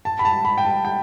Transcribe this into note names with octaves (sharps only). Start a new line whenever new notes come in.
A5
B5
A5
B5
G5
A5
G5